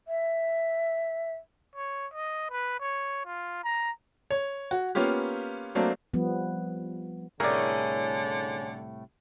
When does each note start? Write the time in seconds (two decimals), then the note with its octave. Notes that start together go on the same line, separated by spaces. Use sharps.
0.08 E5
1.75 C#5
2.13 D#5
2.50 B4
2.80 C#5
3.26 F4
3.64 A#5
4.31 C#5
4.71 F#4
4.95 A#3 B3 C#4 F4 G4
5.75 F#3 A3 A#3 C4 D4
6.14 F3 G3 B3
7.40 C2 A2 D3 A3 C#4 G#4 A#4 D5